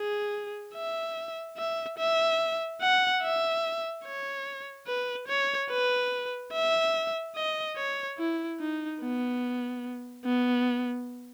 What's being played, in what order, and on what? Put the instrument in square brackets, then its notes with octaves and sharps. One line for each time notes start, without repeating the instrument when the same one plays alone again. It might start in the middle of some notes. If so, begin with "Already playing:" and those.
Already playing: [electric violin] G#4
E5
E5
E5
F#5
E5
C#5
B4
C#5
B4
E5
D#5
C#5
E4
D#4
B3
B3